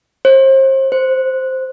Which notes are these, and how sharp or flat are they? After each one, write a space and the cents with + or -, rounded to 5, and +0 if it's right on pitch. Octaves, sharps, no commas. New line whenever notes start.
C5 +35
C5 -5